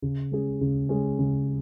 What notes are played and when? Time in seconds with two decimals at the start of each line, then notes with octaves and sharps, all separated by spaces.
0.02 C#3
0.32 G#3 C#4 G#4
0.61 C#3
0.89 G#3 C#4 G#4
1.19 C#3